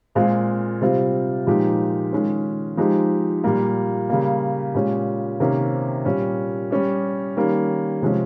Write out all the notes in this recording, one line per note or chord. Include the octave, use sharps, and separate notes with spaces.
A#2 G#3 C4 F4
C3 G3 C4 F4
A#2 F3 G#3 D#4 G4
D#3 G#3 C#4 F4
F3 G#3 D#4 G4
A#2 G3 A#3
C#3 G3 A#3
A#2 G#3 C#4 G4
C3 D#3 A#3 C#4
A#2 G3 C#4
G3 C#4 G4
D#3 G3 A#3 C#4
C3 F3 G#3 C#4